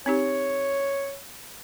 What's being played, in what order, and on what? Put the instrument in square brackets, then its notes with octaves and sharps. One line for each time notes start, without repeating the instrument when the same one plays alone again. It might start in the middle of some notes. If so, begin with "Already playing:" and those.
[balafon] C4 D#4 G4 [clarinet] C#5